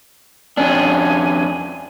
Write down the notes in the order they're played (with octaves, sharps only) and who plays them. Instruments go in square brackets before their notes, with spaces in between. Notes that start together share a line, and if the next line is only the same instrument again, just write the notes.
[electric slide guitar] F2 C#4 D4 [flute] G#5